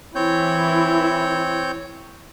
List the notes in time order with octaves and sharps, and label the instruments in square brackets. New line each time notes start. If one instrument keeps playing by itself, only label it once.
[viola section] E3 E4 [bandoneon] C4 C#5 G6